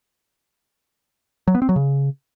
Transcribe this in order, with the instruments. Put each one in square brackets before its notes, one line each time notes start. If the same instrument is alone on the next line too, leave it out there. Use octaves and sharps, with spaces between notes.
[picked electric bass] F#3
B3
C4
F#3
C#3